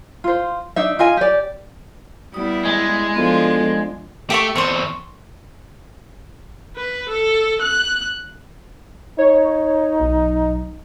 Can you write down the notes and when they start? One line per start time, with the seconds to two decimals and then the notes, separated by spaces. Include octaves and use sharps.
0.24 F4 C5
0.76 D4 D#4 E5
0.99 F4 D#5 G#5
1.17 G4 D5
2.34 G3 B3 E4 D#6
2.65 G#3
3.15 F3 B3 D4 F4 A4
4.30 A3 G4 E5 C#6
4.56 E2 C4 C6 C#6
6.77 B4
7.09 A4
7.62 F#6
9.18 D#4 C#5
10.00 B1